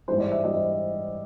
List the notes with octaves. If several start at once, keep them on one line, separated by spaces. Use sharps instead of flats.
G#2 E3 G3 C5
D5
E5
G#2 E3 G3 D#5